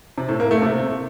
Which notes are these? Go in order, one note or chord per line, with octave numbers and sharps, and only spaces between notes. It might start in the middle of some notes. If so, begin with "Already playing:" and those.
C3
A2
A#3
A3
C3